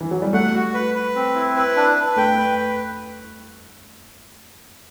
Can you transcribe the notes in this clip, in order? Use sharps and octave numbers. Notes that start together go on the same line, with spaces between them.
E3
F#3
G3
A3 F#5
F#4
B4
B4
C4
E4
B4
D4
B4
A3 G5
B4